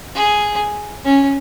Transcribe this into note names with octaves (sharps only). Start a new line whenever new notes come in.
G#4
C#4